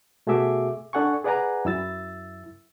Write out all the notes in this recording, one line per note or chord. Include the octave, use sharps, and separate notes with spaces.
B2 A3 F#4 G#4 E5 D6
D4 A4 F#5 G#5 C#6
G#4 B4 D5 F#5 G#5 A#5
F#2 E4 E6 A6